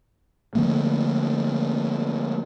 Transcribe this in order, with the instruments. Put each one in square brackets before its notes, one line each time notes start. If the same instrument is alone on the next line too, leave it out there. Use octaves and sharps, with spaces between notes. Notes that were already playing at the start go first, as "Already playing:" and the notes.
[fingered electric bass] D3 F3 A3 A#3